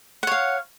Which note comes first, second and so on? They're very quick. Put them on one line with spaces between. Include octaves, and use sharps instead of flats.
F#5 C#5 F5